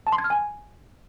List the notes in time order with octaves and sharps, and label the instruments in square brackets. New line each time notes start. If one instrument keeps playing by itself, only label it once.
[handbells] A5
C6
G#6
F6
G#5